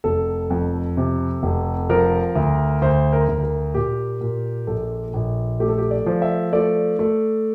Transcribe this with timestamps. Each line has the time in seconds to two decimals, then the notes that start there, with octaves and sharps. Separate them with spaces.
0.04 F1 A4
0.50 F2
0.97 C3
1.43 F1
1.90 F3 A#4
2.36 D2
2.82 D2 C5
3.13 A#4
3.28 D2
3.43 A#4
3.74 A#2 G4
4.21 A#2
4.67 A#1 A4
5.14 A#1
5.60 A3 G4
5.68 A4
5.78 G4
5.91 D5
6.06 F3
6.22 E5
6.53 A3 D5
6.99 A3